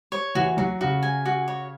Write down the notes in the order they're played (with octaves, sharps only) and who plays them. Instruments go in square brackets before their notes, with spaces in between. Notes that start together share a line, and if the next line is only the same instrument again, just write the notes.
[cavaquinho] C#5
[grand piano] E3 [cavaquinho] F#4
[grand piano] F#3 [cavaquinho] F#4
[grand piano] C#3 [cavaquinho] F#4
[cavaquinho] G#5
F#4
C#5